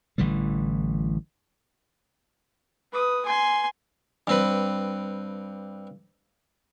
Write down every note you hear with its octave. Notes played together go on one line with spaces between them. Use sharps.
A1 D3 E3 G3
B4 D#6
G#5 C6
G2 C4 B4